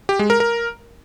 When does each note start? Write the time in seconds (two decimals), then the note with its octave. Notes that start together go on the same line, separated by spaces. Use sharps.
0.09 G4
0.19 G#3
0.30 A#4
0.40 A#4